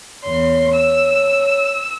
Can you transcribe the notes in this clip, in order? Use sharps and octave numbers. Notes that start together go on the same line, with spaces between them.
E2 C#5 C6
E6